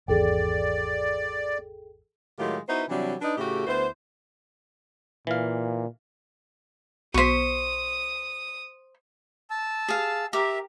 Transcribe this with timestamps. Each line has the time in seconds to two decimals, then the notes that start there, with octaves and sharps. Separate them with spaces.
0.08 G#1 E2 G#4 A4 D5 G5
2.39 A2 D#3 F#3 G#3 F4 G4
2.68 B3 D#4 E4 F#4 B4 C5
2.89 C3 E3 F#3 G3 D4
3.21 D4 D#4 B4
3.38 A2 C#3 A3 F#4 G4
3.67 D2 B3 E4 C5
5.27 A#2 E3 F5
7.14 B1 C5 C#6 D#6 B6
9.50 A5 E6
9.88 G#4 F5
10.33 G4 A#4 E5